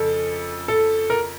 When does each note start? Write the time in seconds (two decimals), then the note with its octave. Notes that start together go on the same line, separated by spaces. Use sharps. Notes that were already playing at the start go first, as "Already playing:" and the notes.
Already playing: F2 C#3 A4
0.68 A4
1.10 A#4